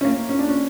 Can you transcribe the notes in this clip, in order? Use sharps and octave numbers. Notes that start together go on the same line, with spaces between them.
C#4
A#3
C#4
D4
C#4